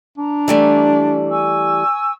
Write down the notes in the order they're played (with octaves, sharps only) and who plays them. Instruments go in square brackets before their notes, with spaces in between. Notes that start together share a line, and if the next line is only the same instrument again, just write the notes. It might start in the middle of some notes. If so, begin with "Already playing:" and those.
[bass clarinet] D4 [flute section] A#5
[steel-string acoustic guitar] E3 G3 A3
[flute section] G#5 C#6 E6